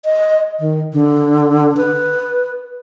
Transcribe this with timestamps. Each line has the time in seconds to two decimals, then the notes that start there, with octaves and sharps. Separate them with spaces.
0.05 D#5
0.60 D#3
0.93 D3
1.77 B4